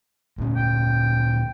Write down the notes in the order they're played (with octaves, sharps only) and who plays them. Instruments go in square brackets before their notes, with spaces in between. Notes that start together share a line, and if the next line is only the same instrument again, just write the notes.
[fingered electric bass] D2 A#2 C#4
[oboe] G5